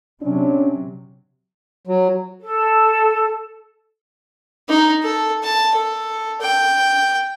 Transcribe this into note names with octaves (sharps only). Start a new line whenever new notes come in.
C3 F#3 C#4 D4
F#3
A4
D#4
A4
A5
A4
G5